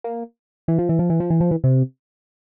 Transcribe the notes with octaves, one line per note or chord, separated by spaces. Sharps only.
A#3
E3
F3
E3
F3
E3
F3
E3
F3
E3
C3